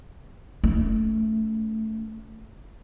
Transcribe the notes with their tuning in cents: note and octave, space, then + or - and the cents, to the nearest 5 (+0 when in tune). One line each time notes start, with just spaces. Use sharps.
A3 -5 C#4 +30